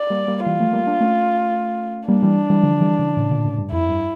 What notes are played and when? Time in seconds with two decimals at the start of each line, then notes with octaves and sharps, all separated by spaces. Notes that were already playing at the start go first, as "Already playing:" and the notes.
Already playing: D5
0.10 G3 A#3
0.28 G3 A#3
0.46 E3 G3 F4
0.59 F3 A3
0.73 G3 A#3
0.87 A#3 D4
1.00 A3 C#4
2.08 G3 A#3 D4
2.23 E3 G3
2.50 E3 G3
2.63 D3 F3
2.81 E3 G3
2.99 C#3 E3
3.17 A2 C#3
3.31 A#2 D3
3.45 A2 C#3
3.58 G2
3.72 F2 E4
3.89 G2